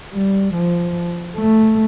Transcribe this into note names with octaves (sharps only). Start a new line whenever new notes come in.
G3
F3
A3